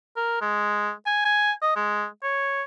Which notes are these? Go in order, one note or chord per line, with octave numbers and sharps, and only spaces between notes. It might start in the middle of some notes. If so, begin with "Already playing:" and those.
A#4
G#3
G#5
G#5
D#5
G#3
C#5